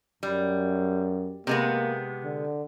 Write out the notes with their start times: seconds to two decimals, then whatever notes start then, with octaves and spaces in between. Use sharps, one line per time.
0.23 F#2 G3
1.47 C3 G#3 A#3 B3
2.25 D3